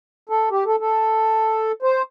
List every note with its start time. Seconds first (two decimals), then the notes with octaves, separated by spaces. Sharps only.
0.29 A4
0.51 G4
0.66 A4
0.80 A4
1.82 C5